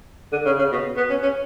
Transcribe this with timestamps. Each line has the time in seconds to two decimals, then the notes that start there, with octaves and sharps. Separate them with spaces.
0.32 D3
0.45 C#3
0.58 C#3
0.71 B2
0.97 B3
1.10 C#4
1.22 C#4